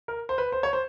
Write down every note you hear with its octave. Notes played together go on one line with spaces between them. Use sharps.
A#4
C5
B4
C5
C#5
C5